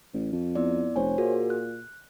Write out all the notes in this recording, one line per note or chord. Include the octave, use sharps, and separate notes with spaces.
A1
F2
B3 E4 D5
F1 C5 C#5 G#5
A#2 F#4 G#4 A#4
F#6